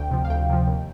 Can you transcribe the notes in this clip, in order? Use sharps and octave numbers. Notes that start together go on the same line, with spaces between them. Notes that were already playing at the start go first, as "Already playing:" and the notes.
Already playing: D2 G5
C3 F3
F5
D2 G5
C3 F3
D#2